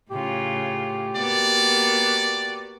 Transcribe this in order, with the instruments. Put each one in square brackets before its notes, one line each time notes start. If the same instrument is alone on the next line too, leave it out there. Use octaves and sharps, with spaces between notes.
[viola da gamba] A2 C#3 F4 [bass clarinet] G4
[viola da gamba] A#3 B3 F#4 [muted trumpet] D5